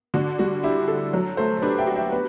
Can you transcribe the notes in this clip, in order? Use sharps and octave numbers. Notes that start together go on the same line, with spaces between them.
D3 F#4
G3 F#4
D4 E4 G4
A4
F#3
A3 A4 C5
A4
D4 G4 B4
E5 G5
F#4
E5 G5
B3 G4 B4